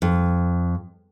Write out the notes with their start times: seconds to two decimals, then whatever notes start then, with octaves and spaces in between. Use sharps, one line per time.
0.02 F2